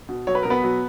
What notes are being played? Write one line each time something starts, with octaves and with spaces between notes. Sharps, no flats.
B2
F#3 C#5
B4
B2 A#4
B3 B4
F#3